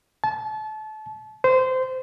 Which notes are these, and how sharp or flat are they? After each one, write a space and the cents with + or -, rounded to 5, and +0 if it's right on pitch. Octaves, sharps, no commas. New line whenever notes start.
A5 -30
C5 -20